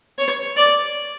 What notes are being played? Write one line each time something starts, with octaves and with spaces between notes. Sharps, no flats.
C#5
D5